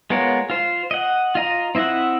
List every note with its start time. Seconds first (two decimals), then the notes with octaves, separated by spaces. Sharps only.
0.10 G#3 B3 F4 A#4 C#5
0.50 F4 C5
0.91 D#5 F#5
1.35 F4 D#5 A#5
1.75 C4 E4 D#5 E5 F#5